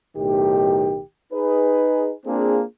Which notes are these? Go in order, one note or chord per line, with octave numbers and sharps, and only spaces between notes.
B1 A2 D#3 G4
D#4 G#4 B4
A#3 C4 D4 F4 G#4